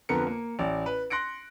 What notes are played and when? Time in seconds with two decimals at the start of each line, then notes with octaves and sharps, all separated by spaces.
0.09 F2 D3 B3 A#4 C#7
0.27 A#3
0.59 A1 D5
0.86 B4
1.10 C6 F#6 A#6 C#7 D7